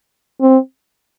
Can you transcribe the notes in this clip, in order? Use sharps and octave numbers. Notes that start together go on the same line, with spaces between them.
C4